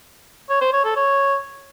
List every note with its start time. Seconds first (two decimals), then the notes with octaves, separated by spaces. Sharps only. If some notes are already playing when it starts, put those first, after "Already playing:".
0.49 C#5
0.61 C5
0.73 C#5
0.84 A4
0.96 C#5